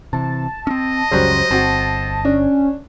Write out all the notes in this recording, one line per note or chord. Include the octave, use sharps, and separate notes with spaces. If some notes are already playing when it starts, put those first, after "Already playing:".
C3 E3 A5
C4 C#4 D#5
C#2 F#2 C#3 F#3 G3 C5
G1 C4 F#4 A5
C#4 D4